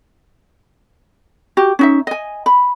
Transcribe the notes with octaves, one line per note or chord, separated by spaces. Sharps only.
F#4 G4
C#4 D#4 E5
D#5 G#5
B5